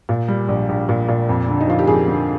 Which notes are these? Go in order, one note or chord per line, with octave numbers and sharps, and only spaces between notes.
A#2
G3
A#1
A#1
A#2
A#2
F2
D3
D#4
F3 F4
G4
F2 G#4
D3